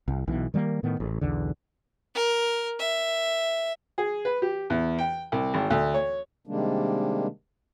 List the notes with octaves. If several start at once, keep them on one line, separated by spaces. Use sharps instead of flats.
C2
B1 B2 E3
D#3 G3 G#3 A#3
A2 D#3 B3
A1
B1 E2 D3
A#4
E5
G#4
B4
G4
E2
G5
C2
G#1
D2
C#5
C3 D#3 G3 G#3 A#3 D4